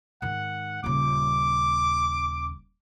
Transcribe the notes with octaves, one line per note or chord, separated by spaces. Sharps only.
G#2 D#3 F#5
D#1 C#3 D6